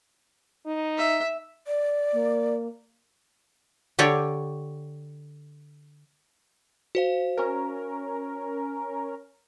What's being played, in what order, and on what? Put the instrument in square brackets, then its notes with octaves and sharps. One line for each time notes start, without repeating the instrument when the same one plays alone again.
[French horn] D#4
[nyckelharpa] E5
[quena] D5
[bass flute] A#3
[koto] D3 G4 C#5 D5
[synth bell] F#4 C5 F5
[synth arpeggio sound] C#4 A#4